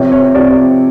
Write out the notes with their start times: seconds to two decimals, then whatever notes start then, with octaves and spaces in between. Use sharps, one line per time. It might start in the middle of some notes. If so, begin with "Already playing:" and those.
Already playing: C3 F3 C#5
0.12 C#5
0.35 C3 F3 D5